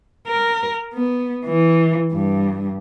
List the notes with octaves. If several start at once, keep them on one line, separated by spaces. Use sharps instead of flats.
A#4
B3
E3
G2